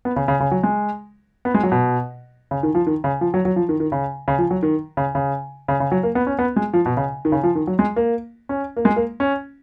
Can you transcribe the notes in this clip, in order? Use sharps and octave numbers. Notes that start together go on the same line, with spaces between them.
B3
C#3
C#3
C#3
F#3
G#3
B3
G#3
F#3
B2
C#3
D#3
F3
D#3
C#3
F3
F#3
F#3
F3
D#3
D#3
C#3
C#3
F3
F#3
D#3
C#3
C#3
C#3
C#3
F#3
A#3
B3
C#4
B3
G#3
F3
B2
C#3
D#3
C#3
F3
D#3
F#3
G#3
A#3
C#4
A#3
G#3
A#3
C#4